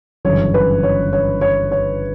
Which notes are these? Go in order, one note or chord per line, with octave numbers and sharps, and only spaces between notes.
G1 F#2 C#3 E3 C#5
B4
C#5
C#5
C#5
C#5